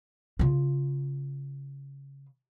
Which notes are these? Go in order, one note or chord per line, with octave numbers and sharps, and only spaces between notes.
C#3 F4